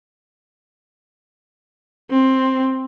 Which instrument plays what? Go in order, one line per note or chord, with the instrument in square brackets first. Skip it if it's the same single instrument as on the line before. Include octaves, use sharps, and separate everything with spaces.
[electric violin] C4